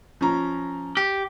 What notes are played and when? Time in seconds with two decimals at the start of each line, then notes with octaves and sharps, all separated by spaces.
0.21 F3 C#4 A#5
0.97 G4